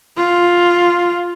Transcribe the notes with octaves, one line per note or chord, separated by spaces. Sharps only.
F4